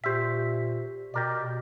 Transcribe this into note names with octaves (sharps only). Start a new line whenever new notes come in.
A#2 G4 C5 E5 B6
B2 G4 A#4 D5